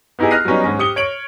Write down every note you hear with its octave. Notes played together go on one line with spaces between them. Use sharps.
B3 D#4 E4 G4 G#4
F6 F#6 A#6 C7 D#7
F#3 G3 B3 C#4 D#4
G#2 C#4
G4 D#6 C#7 G7
C#5 D7 F#7